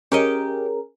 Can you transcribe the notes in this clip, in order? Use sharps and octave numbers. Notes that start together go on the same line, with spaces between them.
C#4 G4 G#4 A#4 C#5 D#5